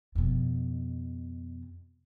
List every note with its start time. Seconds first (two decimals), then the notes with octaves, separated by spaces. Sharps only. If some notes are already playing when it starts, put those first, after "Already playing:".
0.15 F2 B2